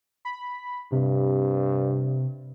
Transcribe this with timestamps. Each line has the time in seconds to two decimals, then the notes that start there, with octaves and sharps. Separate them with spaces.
0.25 B5
0.92 G2 C3